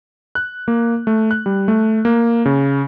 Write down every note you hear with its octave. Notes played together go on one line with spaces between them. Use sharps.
F#6
A#3
A3
F#6
G3
A3
A#3
C#3